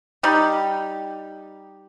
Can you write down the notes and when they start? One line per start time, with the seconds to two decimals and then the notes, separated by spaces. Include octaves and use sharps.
0.23 G3 D#4 G4